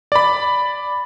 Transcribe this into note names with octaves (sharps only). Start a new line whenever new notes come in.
D5 B5